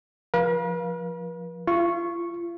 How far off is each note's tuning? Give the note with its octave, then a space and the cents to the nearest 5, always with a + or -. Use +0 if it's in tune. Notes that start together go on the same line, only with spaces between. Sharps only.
F3 +0 B4 -45 F5 +0
F4 -35 C#6 -10